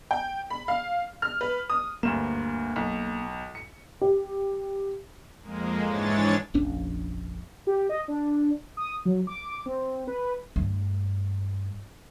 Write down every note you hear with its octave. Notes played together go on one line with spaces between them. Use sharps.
G5
B5
F5
F6
B4
D#6
D2 G2 A#3 E7
B1
C#7
G4
F2 G#3 A#3
G#2 E3 G#3 D4 C#5 A6
F1 A#1 C#4 D4
G4
D#5
D4
D#6
F#3
D6
C4
B4
G2 A3